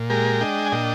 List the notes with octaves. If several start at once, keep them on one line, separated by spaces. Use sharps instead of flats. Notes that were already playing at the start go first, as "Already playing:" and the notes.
Already playing: A#2
G#3 G4 A#4
D4 D#5 G5
G#5
A#2 D#5 G5